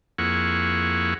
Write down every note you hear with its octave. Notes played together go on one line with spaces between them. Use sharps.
F2 A#3 E4 G#4 F#5 C#6